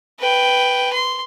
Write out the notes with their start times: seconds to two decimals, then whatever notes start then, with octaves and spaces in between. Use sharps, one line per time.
0.19 B4 G5
0.93 C6